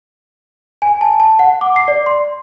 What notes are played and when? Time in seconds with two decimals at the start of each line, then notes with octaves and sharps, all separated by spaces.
0.82 G#5
1.01 A5
1.20 A5
1.39 F#5
1.61 D6
1.76 C7
1.88 D5
2.06 C6